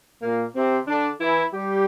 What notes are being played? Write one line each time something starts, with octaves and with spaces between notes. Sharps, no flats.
A#2 A#3
C3 C4
D3 D4
E3 E4
G3 G4